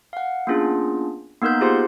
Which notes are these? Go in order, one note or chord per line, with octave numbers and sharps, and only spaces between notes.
F5 F#5
A#3 B3 C#4 D4 F4 G#4
A#3 B3 D#4 A#4 F#6 G6
F4 G4 G#4 C5 C6